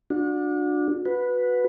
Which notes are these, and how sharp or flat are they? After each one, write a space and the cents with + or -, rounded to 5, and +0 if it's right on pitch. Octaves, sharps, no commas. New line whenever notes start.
D4 +10 F#4 -35
F#4 -20 B4 +0